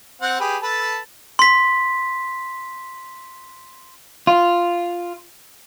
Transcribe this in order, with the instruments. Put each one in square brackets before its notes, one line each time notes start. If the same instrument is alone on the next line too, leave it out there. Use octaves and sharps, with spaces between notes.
[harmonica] C4 F#5
G4 G#4 B4
A4 B4 A5
[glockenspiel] C6 B6
[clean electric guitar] F4